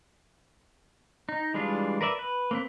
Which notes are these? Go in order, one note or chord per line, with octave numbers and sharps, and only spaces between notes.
D#4
E3 G3 G#3 D4 F4
A#4 B4 D5 E5
B4
A#3 C4 B4